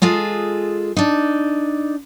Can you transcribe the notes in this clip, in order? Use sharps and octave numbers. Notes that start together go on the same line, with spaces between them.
G#3 F4 G#4 A4
D4 D#4